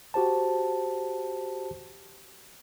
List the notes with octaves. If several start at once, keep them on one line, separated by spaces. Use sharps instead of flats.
F#4 G4 C5 A5